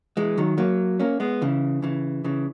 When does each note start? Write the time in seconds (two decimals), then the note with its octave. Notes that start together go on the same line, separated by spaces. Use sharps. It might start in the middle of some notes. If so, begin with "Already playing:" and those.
0.17 E3 G#3
0.38 D#3 F#3
0.58 F#3 A#3
0.99 A#3 C#4
1.20 G#3 B3
1.42 C#3 E3
1.82 C#3 E3
2.24 C#3 E3